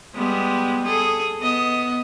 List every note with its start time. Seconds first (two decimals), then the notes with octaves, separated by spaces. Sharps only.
0.15 G3 G#3 B3
0.86 G#4 A4
1.39 B3 D#5